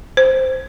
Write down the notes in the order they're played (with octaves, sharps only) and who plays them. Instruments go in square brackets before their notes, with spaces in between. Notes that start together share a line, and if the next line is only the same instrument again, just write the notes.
[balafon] C5